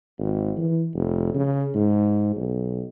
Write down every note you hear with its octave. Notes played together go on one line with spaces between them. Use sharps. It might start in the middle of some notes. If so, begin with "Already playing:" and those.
G#1
E3
F1
C#3
G#2
B1